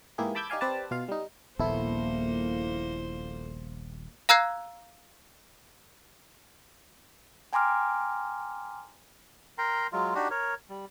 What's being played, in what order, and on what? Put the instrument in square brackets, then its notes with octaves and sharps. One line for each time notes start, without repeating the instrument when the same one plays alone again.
[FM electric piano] G#2 E3 A#3 E4 G4 G#4
A5 B5 D6 E6 G6 G#6
D#4 G4 D5 F5 G#5
C4 G4 B4 D5 A5
B2 F4 F5
G3 D#4
[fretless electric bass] D#1 A#1 B3 [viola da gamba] A#2 A#3 C5 [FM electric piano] E4 A4
[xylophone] F5 A#5 E6 F#6 G#6 C7
[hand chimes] G5 G#5 A#5 C6 D6 F6
[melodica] A#4 G5 A#5 C6
F#3 G#3 F4
D4 D#4 F#4 G4
A#4 C#5
G3